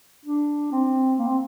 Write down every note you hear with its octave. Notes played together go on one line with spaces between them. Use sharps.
D4
C4
A#3
C4